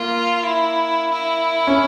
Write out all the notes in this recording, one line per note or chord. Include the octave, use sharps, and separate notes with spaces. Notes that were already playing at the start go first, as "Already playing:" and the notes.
Already playing: A#3 F4
E4
E4
C#4